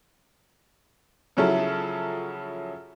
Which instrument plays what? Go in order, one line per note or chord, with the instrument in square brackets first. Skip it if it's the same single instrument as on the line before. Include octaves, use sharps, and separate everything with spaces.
[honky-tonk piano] C#3 F3 F#3 C#4 E4 A4